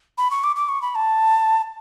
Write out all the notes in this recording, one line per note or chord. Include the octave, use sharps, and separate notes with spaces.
B5
C#6
D6
D6
C#6
B5
A5